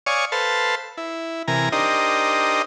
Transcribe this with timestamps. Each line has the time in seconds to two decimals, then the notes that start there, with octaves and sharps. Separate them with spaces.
0.06 C#5 D5 F5 G#5 C#6 D#6
0.32 A4 B4 C5 F5 A5
0.97 E4
1.48 C3 E3 A#4 G#5 A#5
1.72 D4 D#4 G4 A#4 C5 D#5